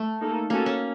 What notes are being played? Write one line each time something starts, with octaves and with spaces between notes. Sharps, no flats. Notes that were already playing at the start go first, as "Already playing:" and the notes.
Already playing: A3
A#3 D#4 A4
A#3 C#4 F#4 A4 C#5
C#4